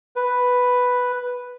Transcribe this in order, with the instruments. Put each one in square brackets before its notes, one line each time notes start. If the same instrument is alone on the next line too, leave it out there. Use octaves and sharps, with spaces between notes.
[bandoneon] B4